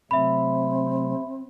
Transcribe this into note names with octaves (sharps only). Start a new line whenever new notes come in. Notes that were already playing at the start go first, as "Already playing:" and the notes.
C3 F#3 A3 C4 E5 B5